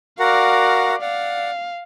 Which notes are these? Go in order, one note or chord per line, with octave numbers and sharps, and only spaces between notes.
F#4 A#4 D5 F5 F#5
D5 F5 F#5